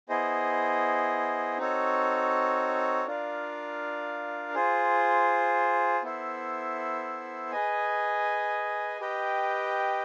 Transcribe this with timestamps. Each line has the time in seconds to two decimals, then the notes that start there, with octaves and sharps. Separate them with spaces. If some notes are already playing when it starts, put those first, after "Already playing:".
0.09 B3 E4 G#4 C5 D#5
1.58 C4 D#4 F#4 A4 C#5
3.07 D4 F4 A#4 D5 F5
4.54 F4 G#4 C5
6.03 B3 E4 A4 C5 E5
7.52 G#4 B4 D#5 G#5
9.00 G4 B4 D#5 G5